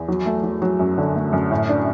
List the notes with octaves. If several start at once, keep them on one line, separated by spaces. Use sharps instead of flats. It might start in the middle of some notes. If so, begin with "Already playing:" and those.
Already playing: E2
F#3
A3
F#3
F#3
F#2
D3
A3
F#2
A2
D4